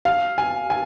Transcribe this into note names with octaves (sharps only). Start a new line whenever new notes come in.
F5
G#5
G#5